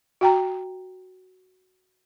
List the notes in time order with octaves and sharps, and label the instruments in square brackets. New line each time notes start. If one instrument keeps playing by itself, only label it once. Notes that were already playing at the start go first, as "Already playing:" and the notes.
[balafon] F#4 G5 A#5